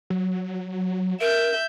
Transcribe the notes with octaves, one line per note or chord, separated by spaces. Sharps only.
F#3
A#4 E5 G6